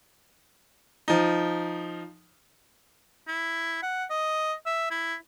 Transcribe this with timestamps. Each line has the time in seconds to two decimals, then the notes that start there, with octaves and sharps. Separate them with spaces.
1.08 F3 D#4
3.28 E4
3.83 F#5
4.10 D#5
4.66 E5
4.91 E4